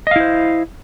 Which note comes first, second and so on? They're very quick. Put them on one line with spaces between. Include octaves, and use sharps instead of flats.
D#5 F5 E4 C5